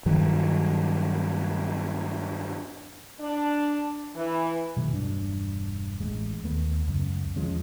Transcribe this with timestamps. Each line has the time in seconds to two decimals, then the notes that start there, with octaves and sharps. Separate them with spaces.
0.06 G2 D#3 F#3
3.20 D4
4.15 E3
4.77 B2 D#3 F#3 A3
4.92 E1 G2 D4
6.00 A1 G#3
6.44 D#2 A3 B3
6.88 C#2 F#2
7.36 E2 F3 G#3 C#4